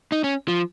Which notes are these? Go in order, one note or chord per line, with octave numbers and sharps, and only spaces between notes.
D#4
C#4
F3